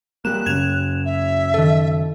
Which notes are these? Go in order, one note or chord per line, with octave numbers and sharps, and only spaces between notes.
G3 A#3 F#6 E7
F#2 C#3 G#6 E7 F7
E5
D#3 A4